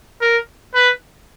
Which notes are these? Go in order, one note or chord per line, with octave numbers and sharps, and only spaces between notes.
A#4
B4